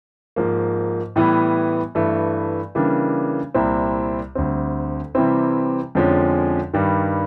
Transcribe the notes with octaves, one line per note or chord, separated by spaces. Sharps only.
G#2 F3 A#3
A2 E3 G3 B3 E4
G2 E3 A3
C#3 E3 G3 A#3 D4
C2 A#2 G3 C4 E4
D2 D3 G3 C4
C3 E3 G3 C4 E4
F2 D3 F3 G#3 C#4
G2 D#3 G3